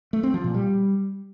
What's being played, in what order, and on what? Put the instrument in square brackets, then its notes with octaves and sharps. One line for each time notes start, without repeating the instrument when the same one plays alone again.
[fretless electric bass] A3
C4
F3
A#2
G3